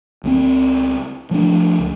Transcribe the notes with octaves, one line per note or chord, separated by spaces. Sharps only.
C#2 G#3 C4
F3 A3 D4
C#2